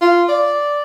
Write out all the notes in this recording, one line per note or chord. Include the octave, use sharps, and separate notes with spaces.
F4
D5